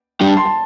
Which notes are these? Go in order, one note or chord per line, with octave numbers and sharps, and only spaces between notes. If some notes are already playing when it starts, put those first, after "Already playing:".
G3 D4 G4 G5
A5
C6
A5